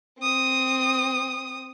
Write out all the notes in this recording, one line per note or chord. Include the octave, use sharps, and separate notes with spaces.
C4 D#6